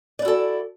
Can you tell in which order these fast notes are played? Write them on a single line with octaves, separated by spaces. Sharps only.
D5 E4 F#4 A4